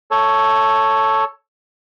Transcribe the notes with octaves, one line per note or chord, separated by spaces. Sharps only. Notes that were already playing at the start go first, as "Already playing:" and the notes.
A4 C#5